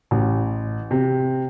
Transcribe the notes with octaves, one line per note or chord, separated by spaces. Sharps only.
A1
C3